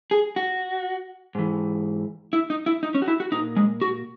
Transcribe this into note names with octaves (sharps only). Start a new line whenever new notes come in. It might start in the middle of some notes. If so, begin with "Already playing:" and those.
G#4
F#4
G#2 E3
E4
D#4
E4
D#4
C#4
F#4
E4
F#4
A#2 D#4
G#3
F#4